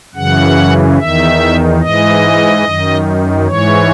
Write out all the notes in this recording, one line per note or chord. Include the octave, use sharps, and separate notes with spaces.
F#2 C#3 E3 F#5
E2 D#3 E5
G#2 E3 D#5
F#2 D#3
G#2 E3 C#5